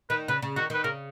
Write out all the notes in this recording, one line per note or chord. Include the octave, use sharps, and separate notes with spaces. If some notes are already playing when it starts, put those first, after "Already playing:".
D#3 B4
C#3 B4
C#3
D#3 F#4
D#3 B4
C#3 A#4